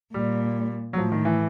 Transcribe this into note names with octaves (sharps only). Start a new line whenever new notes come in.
A#2 G3
F#3
A2 F3
D#3
E3